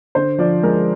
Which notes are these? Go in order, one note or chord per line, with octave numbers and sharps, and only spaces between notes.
D3 C5
F3 D5
G#3 A#4